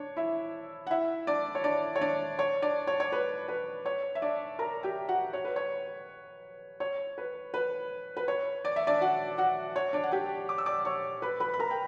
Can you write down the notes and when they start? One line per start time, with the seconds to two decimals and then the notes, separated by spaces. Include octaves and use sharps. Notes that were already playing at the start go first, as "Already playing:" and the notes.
Already playing: D4 C#5
0.17 E4 E5
0.87 F#5
0.91 E4 E5
1.27 D4 D5
1.55 C#5
1.64 D4 D5
1.96 C#5
2.01 D4 D5
2.39 C#5
2.62 D4 D5
2.87 C#5
3.00 C#5
3.12 B4
3.48 B4
3.85 C#5
4.15 E5
4.22 D4 D5
4.59 A#4 A#5
4.83 G4 G5
5.08 F#4 F#5
5.33 C#5
5.45 B4
5.56 C#5
6.80 C#5
7.18 B4
7.54 B4
8.17 B4
8.28 C#5
8.65 D5
8.76 E5
8.87 D4 D5
9.01 F#4 F#5
9.38 F#4 F#5
9.76 C#5
9.93 D4 D5
10.03 F#5
10.11 G4 G5
10.49 D6
10.58 E6
10.66 D5 D6
10.85 C#5 C#6
11.22 B4 B5
11.40 B4 B5
11.54 B5
11.59 A#4 A#5
11.71 G5